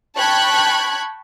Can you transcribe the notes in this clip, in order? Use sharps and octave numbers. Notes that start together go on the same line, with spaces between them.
G5 A5 B5 C#6 F#6 G#6